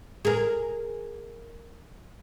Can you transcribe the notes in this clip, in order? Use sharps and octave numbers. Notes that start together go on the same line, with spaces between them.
G#4 A#4